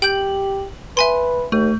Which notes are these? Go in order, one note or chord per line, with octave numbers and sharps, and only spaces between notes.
G4 G5 G6 F#7
B4 E5 G#5 C6
D#2 A3